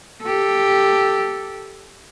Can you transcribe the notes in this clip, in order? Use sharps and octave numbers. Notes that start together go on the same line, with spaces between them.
G4 A4